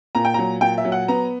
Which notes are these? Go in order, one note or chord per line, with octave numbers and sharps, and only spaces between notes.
A#2 A#5
G5
F#3 A#5
A#2 G5
E5
F#3
F#5
B3 A#5